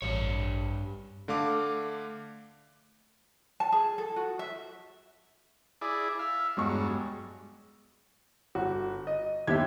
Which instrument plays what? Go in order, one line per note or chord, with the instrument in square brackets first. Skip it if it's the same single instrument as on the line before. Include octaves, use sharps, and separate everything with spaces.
[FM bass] A1 [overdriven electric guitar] G2 C#5
[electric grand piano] D3 A3 F5 D6
[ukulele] A5
G#4
A4
F#4
E5
[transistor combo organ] E4 G#4 D5
E5 F5
[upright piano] E1 G#3 C#6 [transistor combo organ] G2 F#3
[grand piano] G1 F#4
D#5
[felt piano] G1 D#2 G#6 [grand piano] G4 E5